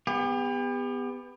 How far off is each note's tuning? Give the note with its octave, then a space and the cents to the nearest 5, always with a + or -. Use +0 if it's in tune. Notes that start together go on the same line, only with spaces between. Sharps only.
B3 +10 G4 +40